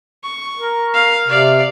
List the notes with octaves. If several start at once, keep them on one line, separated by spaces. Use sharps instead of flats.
C#6
A#4
F5
C3 D5 F5